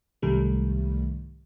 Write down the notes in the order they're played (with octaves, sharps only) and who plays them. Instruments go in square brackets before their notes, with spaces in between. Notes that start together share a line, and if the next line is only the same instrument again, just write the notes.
[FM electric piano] C2 G#2 D#3 G3 A3